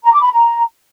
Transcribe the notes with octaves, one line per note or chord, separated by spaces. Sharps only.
A#5
D6
B5
A#5